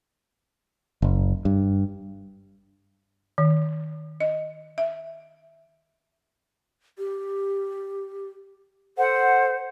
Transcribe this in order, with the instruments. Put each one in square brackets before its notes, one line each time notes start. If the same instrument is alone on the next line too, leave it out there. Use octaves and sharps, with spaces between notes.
[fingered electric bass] F#1
G2
[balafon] D#3
D#5
E5
[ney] G4
[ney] A4 [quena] C5 [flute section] F#5